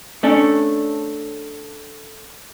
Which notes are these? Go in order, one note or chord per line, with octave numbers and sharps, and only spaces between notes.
A3 C#4 D4